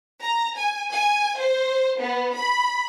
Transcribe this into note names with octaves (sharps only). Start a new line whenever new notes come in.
A#5
G#5
G#5
C5
B3
B5